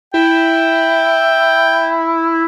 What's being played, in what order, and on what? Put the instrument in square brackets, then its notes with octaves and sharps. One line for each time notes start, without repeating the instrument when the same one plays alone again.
[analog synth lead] E4 [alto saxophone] G5